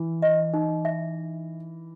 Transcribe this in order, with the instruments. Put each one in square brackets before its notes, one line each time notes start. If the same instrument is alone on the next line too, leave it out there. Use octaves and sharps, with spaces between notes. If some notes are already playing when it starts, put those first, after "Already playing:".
Already playing: [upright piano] E3
[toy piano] D#5
D#4
E5